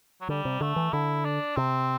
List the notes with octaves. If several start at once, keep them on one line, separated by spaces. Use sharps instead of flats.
F#3
D3 G3
C3
D3 A3
E3
D3 E4
D4
C3 C4